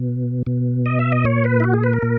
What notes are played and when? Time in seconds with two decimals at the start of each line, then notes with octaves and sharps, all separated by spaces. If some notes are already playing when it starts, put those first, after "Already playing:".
Already playing: B2
0.47 B2
0.86 D#5
0.99 E5
1.12 D#5
1.24 A#2 C#5
1.44 B4
1.60 E4
1.64 F#4
1.74 G#4
1.84 B4
1.93 A#4
2.03 A#2